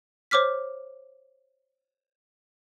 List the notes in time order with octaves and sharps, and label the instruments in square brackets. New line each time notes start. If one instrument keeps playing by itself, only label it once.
[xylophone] C5 C#5 D6 F6 B6